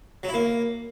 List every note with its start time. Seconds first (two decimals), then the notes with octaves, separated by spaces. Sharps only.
0.23 F#3
0.29 E4
0.34 A#3